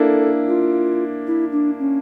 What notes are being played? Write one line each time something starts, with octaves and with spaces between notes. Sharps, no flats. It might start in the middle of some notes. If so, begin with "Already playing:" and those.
Already playing: A#3 D4 E4 A4
F4
E4
D4
C#4